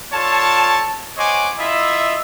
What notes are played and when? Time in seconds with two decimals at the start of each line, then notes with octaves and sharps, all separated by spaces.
0.13 F4 A4 C#5 D5 A5
1.17 C5 C#5 D#5 F#5 G#5 D6
1.58 E4 F4 D#5 E5